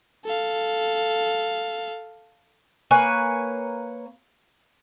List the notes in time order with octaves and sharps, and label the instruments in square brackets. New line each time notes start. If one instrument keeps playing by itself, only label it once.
[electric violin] A4 F5
[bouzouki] A#3 B4 C#5 G#5